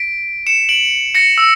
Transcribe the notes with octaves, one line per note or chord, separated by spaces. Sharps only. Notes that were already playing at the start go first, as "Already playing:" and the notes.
Already playing: B6 D7
C#7 E7
D7 F#7
A#6 C#7
E6